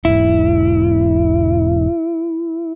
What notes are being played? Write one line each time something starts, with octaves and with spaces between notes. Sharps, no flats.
E1 G#2 E4